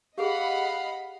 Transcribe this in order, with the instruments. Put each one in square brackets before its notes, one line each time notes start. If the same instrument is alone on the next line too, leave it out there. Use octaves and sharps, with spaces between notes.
[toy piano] G4 G#4 [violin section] D#5 F#5 B5 [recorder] F5